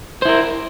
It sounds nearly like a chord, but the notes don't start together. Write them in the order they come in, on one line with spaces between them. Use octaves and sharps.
C5 E4 A#4